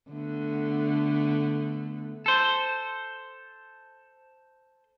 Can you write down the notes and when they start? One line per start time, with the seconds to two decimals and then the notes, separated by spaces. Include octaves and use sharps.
0.10 D3 A3 B3
2.26 A4 C5